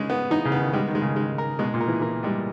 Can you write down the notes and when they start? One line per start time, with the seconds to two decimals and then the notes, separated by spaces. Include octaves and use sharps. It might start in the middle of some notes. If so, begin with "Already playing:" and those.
Already playing: C#3 G#3
0.10 B3
0.30 E3 D#4
0.45 C#3
0.52 B3
0.59 D#3
0.73 G3 G#3
0.88 D#3
0.95 G#3
1.02 C#3
1.16 G#3
1.38 A#4
1.59 B2 G#3
1.74 A#2
1.81 A#4
1.88 E3
2.01 E3 A#4
2.23 G3 G#3